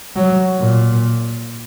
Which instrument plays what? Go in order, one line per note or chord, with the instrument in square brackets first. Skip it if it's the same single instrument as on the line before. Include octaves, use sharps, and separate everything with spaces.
[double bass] F#3
A#2